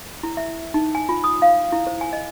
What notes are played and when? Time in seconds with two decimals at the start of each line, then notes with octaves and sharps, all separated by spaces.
0.23 E4
0.37 E5
0.74 D#4
0.95 G#5
1.09 F4
1.24 D#6
1.42 F5
1.72 E4
1.87 C5
2.01 G#5
2.13 D#5